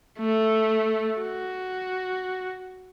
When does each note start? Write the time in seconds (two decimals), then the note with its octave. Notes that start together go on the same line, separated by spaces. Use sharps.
0.19 A3
1.21 F#4